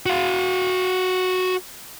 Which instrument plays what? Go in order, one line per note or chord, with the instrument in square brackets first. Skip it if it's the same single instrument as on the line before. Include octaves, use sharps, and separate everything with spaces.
[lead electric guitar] F#4 F5